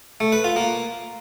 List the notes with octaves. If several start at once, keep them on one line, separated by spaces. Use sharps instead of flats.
A3
B4
F4
A#3